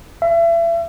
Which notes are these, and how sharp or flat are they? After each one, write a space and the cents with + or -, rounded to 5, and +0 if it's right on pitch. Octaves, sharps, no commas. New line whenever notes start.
E5 +35